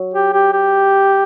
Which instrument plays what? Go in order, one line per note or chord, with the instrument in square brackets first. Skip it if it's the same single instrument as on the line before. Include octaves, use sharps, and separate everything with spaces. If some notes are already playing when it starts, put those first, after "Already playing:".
Already playing: [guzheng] F#3
[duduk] G4
G4
G4